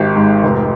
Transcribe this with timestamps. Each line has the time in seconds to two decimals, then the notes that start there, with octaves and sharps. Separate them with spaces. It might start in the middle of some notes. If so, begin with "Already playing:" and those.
Already playing: G#1 D#3 G4
0.16 G#2
0.43 F1